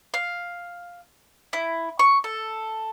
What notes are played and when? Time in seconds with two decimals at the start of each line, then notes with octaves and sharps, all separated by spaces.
0.14 F5
1.53 E4
1.99 C#6
2.24 A4